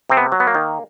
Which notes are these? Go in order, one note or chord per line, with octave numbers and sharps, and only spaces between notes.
C3 C4
B3
F#3
B3
A#3
D#3